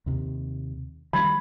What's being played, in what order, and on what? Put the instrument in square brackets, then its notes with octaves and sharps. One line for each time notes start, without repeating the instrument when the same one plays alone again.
[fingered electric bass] D#2 C3
[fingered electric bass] D#3 G3 [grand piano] B5 G#6